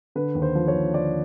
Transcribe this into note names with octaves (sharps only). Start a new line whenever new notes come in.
D3 B4
D#2
C5
F3
C#5
D#2
D3 D5